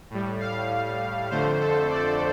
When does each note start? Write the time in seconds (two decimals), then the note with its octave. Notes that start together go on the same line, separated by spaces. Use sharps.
0.10 A2 G3
0.40 F5
1.30 F2 D3 A3 C5
1.60 A4
1.90 D5